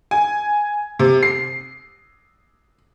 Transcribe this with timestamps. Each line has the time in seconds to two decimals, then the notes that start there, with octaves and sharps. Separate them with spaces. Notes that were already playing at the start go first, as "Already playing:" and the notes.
0.11 G#5
0.99 C3
1.23 C7